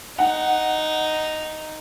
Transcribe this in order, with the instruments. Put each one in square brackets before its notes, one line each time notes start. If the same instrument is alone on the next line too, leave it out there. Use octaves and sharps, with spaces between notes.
[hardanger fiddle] D#4 [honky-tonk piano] F#5